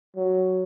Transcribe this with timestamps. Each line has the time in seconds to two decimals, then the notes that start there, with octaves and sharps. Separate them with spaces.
0.16 F#3